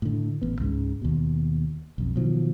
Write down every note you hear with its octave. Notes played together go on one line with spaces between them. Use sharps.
A2 D3
A1 B3
C#2 G#2 C#3
D#2 B2
B1 F2
B2 D#3 F3 F#3